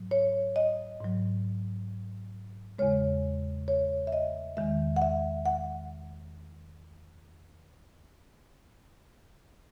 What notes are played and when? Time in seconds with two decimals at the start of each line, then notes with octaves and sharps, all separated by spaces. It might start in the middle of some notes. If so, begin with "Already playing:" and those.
Already playing: G#2 F#3
0.11 C#5
0.56 D#5
1.01 G#2 F#3
2.79 E2 C#3 G#3 C#5
3.68 C#5
4.07 E5
4.12 D#5
4.57 E2 D#3 G#3 E5
4.96 F#5
5.02 E5
5.46 F#5